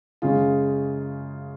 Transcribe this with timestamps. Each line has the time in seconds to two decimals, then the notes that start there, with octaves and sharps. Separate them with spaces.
0.22 F#2 C#3 G#3 F4 G#4